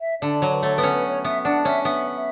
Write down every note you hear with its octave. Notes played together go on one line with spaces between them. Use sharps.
E5
D3 D5
F#3 C#5
B4
A3 C#5
B3 B4
C#4
B4
C#5
B3 E5
D4 F#5
C#4 E5
B3 E5
E5